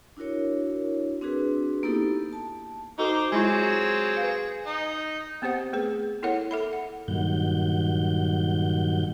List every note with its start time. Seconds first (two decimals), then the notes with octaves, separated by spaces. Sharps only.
0.17 D4 E4 F#4 A#4 C#5
1.21 C4 D4 F#4 G#4 B4
1.83 A#3 B3 D#4 E4 G4 A4
2.33 A5
2.99 D#4 F#4 A4 C5 G5 D6
3.32 F#3 G#3 C4 E4 F4 G#4
4.17 B4 F5
4.66 D#4
5.42 B3 C4 G4 C5 F#5
5.73 A3 B3 G#4 B4
6.23 B3 E4 A4 A#4 C#5 F#5
6.51 A4 E5 B5
6.73 F#5
7.08 G2 A#2 D#3 F#3 F#5 G6